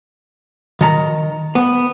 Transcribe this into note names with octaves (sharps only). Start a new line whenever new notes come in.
D#3 A#5
B3